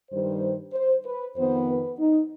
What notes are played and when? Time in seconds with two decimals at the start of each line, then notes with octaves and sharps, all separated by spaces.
0.11 G2 D#3 G3 C5
0.73 C5
1.05 B4
1.36 F2 D#3 B3 C5
1.68 B4
1.98 D#4